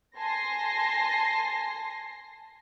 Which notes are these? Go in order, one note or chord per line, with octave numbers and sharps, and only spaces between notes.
G#5 A5 C6 A#6 C7